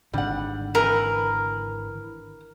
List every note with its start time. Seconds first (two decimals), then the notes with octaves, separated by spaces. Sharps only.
0.13 G#1 D3 G3 F#5
0.75 E3 A#4 B4